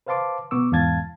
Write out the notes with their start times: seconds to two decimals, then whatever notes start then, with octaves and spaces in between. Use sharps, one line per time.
0.06 B4 C5 F5 A5 C6 D6
0.51 B2 B3 C#6 D6 E6
0.72 E2 G#2 F5 A5 G#6 A6